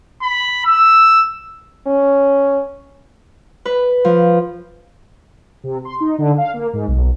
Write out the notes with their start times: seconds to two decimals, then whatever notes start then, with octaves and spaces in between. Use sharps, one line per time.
0.22 B5
0.65 E6
1.87 C#4
3.65 B4
4.05 F3
5.64 C3
5.85 C6
6.00 D#4
6.18 D3
6.38 F5
6.54 A#3
6.73 G#2
6.88 B1